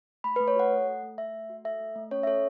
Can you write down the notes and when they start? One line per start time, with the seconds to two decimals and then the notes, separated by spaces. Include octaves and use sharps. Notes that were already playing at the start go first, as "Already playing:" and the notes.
0.24 A3 B5
0.36 B4
0.40 A3
0.48 C#5
0.56 F#4 F#5
0.72 A4
0.87 A3
1.03 A3
1.18 A3 E5
1.33 A3
1.50 F#4
1.65 A4 E5
1.80 A3
1.96 A3
2.11 C#4 C#5
2.23 E5
2.27 A4 C#5